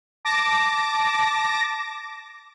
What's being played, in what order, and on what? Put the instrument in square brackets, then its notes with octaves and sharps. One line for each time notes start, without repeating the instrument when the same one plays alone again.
[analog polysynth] A5 D6 A#6